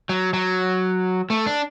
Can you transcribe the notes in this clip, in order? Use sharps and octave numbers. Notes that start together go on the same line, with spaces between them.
F#3
F#3
A3
D4